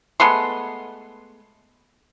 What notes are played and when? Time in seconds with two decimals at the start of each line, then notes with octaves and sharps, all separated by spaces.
0.20 G#3 A3 B3 C6